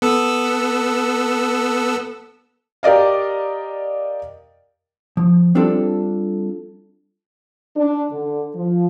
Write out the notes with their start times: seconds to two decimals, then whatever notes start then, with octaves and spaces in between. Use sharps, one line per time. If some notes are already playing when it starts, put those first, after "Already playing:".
0.02 B3 A4 E6
2.83 G4 A#4 D5 D#5 F5
5.17 F3
5.55 G3 C4 D4 F4 A4
7.76 D4
8.11 D3
8.55 F3